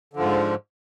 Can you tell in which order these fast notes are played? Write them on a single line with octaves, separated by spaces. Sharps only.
D3 F3 G#2